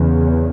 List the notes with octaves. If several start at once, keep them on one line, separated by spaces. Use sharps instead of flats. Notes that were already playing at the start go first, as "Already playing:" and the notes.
Already playing: E2 C#3